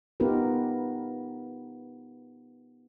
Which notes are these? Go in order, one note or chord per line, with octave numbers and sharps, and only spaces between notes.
B3 D#4 F4 G4 A#4 B4